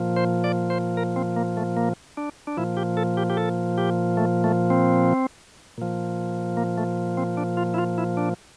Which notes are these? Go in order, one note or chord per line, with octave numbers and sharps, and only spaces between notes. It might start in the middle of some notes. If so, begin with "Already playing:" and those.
Already playing: A#2 F3
C5
D5
C5
A#4
C4
A#3
A3
A#3
D4
D4
A#2 F3 E4
G4
A4
G4
G4
A4
G4
A3
A3
C4
A#2 F3
A#3
A3
C4
D4
F4
E4
F4
E4
D4